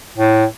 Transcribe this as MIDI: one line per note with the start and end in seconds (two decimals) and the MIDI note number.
0.18 0.45 45